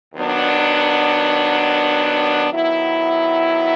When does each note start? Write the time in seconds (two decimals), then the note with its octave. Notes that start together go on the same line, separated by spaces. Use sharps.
0.15 D#2 D#3 F#3 B3 D4
2.50 D#3 F#3 B3 E4